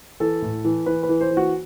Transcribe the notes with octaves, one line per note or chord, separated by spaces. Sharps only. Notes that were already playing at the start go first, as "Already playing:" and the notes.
E3 A4
A2
E3
E3 B4
B4
E3
C5
E3
F#4